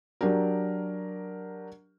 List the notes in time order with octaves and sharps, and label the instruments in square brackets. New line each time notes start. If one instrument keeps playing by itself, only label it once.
[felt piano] F#3 D4 G4 A#4